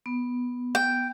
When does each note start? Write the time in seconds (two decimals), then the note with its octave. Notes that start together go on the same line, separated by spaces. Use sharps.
0.06 B3
0.75 G5